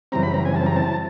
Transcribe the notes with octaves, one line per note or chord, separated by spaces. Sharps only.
F#2 C#3 E3 G3 C4 A#5
B5
A#5
G#5
A5
A#5
A5